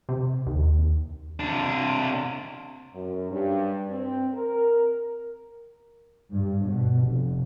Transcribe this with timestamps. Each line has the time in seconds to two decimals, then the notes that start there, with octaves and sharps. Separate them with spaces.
0.09 C3
0.46 D#2
1.40 C3 D4
2.93 F#2
3.30 G2
3.90 C4
4.34 A#4
6.32 G2
6.65 B2
7.03 F1